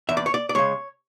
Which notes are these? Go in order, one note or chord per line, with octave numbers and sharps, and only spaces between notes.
E2 E5
D5
C#5
D5
D5
C#3 G#3 C#5